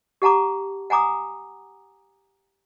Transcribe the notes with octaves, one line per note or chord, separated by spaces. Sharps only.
G4 F#5 A5 A#5 D6
F#5 G#5 A#5 D6 D#6